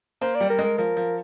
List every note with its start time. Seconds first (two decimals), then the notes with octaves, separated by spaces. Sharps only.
0.21 A#3 C5
0.35 D5
0.41 G3
0.50 A#4
0.59 G#3
0.64 A#4
0.78 F3 A#4
0.97 F3